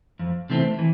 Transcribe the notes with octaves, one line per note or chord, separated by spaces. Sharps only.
F2
C3 E3 A3 C4
E3